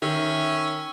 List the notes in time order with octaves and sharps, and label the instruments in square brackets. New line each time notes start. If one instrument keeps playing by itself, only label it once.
[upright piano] D#3 [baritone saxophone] C#4 [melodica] E5